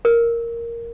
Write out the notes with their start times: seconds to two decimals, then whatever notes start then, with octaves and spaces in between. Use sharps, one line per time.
0.05 A#4